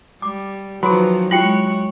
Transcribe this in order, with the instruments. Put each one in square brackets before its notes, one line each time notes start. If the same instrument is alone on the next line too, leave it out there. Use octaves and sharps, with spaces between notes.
[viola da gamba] G3 [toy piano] D6
[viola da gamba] D#3 F3 F#4 [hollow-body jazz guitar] F#3 [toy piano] G#4 C6 [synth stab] B4
[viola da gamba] G#3 E4 C#5 [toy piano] F4 G4 G5 [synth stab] F#6 C#7